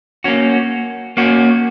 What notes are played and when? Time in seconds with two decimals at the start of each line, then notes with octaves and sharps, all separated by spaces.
0.24 A#3 C#4 F#4
1.17 A#3 C#4 F#4